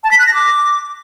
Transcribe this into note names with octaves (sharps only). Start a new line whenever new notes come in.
A5
B6
F#6
A#6
D6